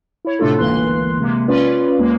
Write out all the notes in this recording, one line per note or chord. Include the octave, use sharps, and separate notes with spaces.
E4 C#5
A2 C3 A3 D4 F4 A4
G1 C#2 E3 A#3 C6 F#6
C3 G#3 A#3
C#4 F4 B4 D5
D#2 G#3 A#3